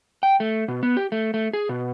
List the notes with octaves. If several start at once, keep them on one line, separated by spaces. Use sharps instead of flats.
G5
A3
B2
B3
G4
A3
A3
G#4
B2